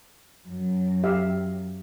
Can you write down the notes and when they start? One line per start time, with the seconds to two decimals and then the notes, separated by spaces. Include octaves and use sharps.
0.48 F#2
1.03 G4 E5 F5